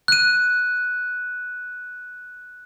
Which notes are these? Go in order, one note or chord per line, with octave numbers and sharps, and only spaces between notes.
F#6 D#7